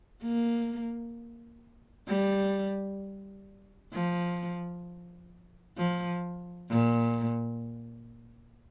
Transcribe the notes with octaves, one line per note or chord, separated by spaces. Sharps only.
A#3
G3
F3
F3
A#2